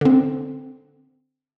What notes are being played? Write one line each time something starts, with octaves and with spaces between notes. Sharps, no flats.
D3 C4